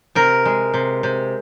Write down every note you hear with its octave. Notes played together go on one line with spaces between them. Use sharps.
C3 A#4
G#3
C3
C3